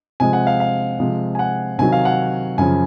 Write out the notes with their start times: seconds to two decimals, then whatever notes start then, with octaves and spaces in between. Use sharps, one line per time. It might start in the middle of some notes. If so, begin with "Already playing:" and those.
0.20 C3 F3 G#3 G#5
0.33 F#5
0.47 F5
0.60 F5
0.99 C3 F3 G#3
1.35 G#5
1.39 F#5
1.78 C3 D#3 F#3 G#5
1.92 F5
2.05 F#5
2.58 F#2 C#3 F3 G#5